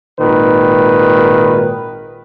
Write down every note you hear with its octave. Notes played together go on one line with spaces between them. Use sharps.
G#1 A#2 D#3 B4